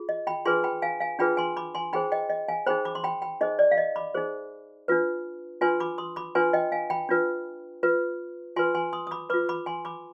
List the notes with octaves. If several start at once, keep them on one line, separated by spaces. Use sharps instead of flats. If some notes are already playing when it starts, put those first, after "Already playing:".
Already playing: F4 G#4
D#5
G5 B5
D4 F4 G#4 B4 G#5 C6
G5 B5
F5 G#5
F5 G#5
D4 F4 G#4 B4 G5 B5
G#5 C6
B5 D6
G#5 C6
D#4 G#4 C5 G5 B5
D#5 G5
D#5 G5
F5 G#5
D#4 G#4 C5 G5 B5
B5 D6
C6
G5 B5
G5 B5
D#4 G#4 C5 D#5
D5
F5
D#5
B5 D6
D#4 G#4 C5
D4 F4 B4
D4 F4 B4 G#5 C6
B5 D6
C6 D#6
B5 D6
D4 F4 B4 G#5 C6
D#5 G5
F5 G#5
G5 B5
D4 F4 B4
F4 B4
F4 B4 G#5 C6
G#5 C6
C6 D#6
D#6
B5 D6
F4 B4 B5 D6
B5 D6
G#5 C6
B5 D6